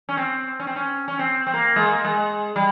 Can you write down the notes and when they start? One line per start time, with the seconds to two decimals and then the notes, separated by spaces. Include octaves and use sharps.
0.09 C#4
0.17 C4
0.60 C#4
0.67 C4
0.76 C#4
1.08 C#4
1.19 C4
1.47 C4
1.54 A#3
1.76 G#3
1.88 A#3
2.04 G#3
2.56 G3